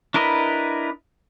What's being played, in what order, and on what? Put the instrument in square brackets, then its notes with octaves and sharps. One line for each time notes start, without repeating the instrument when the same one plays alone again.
[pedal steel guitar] D4 E4 A#4 B4 D#5